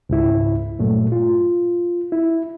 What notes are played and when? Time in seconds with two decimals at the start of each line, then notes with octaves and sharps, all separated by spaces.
0.09 C#2 G#2 E4
0.79 G2 A#2 F#3 A3
1.12 F4
2.12 E4